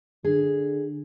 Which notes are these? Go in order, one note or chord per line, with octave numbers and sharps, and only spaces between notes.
D3 G#4